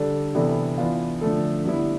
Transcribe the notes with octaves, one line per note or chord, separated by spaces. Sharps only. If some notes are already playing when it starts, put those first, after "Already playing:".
Already playing: D3 G3 D4 A4
C3 E3 B3 D4 A4
E3 B3 D4 F4
D3 F3 A3 D4 A4
D3 G3 B3 E4